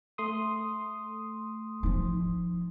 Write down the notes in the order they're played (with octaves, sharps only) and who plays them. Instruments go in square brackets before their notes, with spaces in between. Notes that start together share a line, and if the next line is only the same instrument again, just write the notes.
[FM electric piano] A3 C6 D#6
[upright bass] F3 D#4